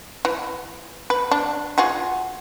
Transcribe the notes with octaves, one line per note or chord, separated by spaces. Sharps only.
E3
B4
D4
F4 F#4 G#4